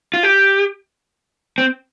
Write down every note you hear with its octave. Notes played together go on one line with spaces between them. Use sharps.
F4
G4
C4